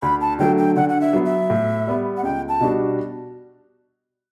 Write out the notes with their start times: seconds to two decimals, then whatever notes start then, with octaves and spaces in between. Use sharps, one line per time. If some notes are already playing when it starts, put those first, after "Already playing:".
0.02 D2 B5
0.21 A5
0.39 D3 F#3 A3 G5
0.58 G5
0.76 D3 F#5
0.89 F#5
1.01 E5
1.13 F#3 B3
1.26 E5
1.50 A2
1.87 G3 B3
2.17 F#5
2.23 C#2 G5
2.49 A5
2.60 B2 G3 D4 F#4